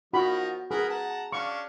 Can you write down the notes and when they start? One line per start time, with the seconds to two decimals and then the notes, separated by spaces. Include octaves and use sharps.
0.13 F3 D#4 F#4 A#4 B5
0.71 G#4 A#4 B4 F#5
0.89 F#5 A5 A#5
1.32 C#4 D4 F5 C#6